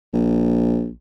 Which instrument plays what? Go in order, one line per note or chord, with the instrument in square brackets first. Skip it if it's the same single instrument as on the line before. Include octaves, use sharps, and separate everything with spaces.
[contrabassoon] A#1